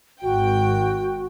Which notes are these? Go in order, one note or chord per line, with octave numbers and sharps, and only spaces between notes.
G#1 F#4 G5